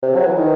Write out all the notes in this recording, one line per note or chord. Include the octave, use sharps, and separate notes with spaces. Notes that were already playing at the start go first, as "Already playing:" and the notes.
C3
F#3
E3
D#3